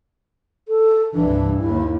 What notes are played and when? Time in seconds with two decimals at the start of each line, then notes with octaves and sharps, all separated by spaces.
0.68 A4
1.15 C2 G2 E3 D4
1.60 D#2 E4